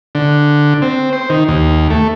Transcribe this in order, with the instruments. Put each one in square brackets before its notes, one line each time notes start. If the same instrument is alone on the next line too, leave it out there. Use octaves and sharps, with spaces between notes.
[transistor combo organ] D3
C4
C5
D#3
D#2
A3